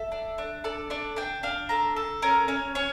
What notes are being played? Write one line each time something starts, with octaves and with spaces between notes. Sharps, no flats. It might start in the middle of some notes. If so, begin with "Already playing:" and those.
Already playing: A4 E5
D4
D4
A4 D5
D4 D5
D4 G5
D4 F5
A4 A#5
A4
C#4 A#4
C#4 C#5
C#4 C#5